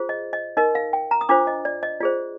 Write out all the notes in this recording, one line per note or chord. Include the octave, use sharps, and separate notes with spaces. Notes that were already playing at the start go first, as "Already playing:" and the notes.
Already playing: F4 G#4 C5
D#5
D#5
D#4 A#4 D#5
F5
G5
A#5
D#6
D4 F4 C5 D6
D#5
D5
D#5
F4 G#4 C5 D5